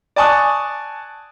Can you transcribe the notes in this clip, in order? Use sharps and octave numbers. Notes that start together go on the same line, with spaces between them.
D5 G#5 A5 C#6 D#6 F#6